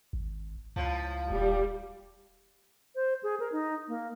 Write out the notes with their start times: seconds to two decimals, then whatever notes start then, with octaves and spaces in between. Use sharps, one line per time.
0.13 G#1
0.76 C#2 A2 F3
1.30 D#1 G3
2.95 C5
3.23 G#4
3.40 A#4
3.52 D#4
3.88 A#3